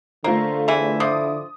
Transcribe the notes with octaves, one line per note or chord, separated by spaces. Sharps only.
D3 A3 A#3 F4 C5
E2 E3 E4
F3 E4 D6 D#6